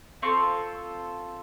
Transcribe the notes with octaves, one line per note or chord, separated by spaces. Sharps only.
C4 F4 A4 C#6